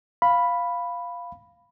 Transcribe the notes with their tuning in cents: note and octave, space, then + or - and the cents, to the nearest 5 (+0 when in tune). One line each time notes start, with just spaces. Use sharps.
F5 +0 B5 +0